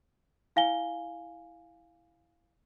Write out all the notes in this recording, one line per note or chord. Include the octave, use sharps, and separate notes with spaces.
E4 F5 G#5 G7